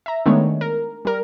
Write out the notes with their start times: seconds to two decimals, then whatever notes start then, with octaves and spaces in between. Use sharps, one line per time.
0.06 E5 A#5
0.26 D#3 G#3 A3 B3 D4 C#5
0.61 A#4
1.05 G3 A#4